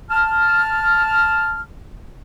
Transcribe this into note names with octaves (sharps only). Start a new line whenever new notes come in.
A5 F6